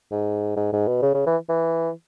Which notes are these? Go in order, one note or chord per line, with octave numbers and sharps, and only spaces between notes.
G#2
G#2
G#2
B2
C#3
C#3
E3
E3